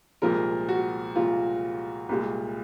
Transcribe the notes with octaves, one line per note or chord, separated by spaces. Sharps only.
C2 A#2 F3 G#3 A#4
F#4
C2 A#2 F3 G#3 F4
C2 A#2 G#3